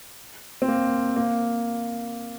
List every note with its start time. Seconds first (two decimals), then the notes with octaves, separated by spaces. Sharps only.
0.62 C4
0.68 A#3
1.16 A#3